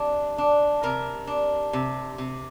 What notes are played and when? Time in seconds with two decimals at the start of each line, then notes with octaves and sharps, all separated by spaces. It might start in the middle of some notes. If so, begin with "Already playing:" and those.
Already playing: C3 D4
0.38 D4
0.83 C3 A#4
1.27 D4
1.73 C3
2.18 C3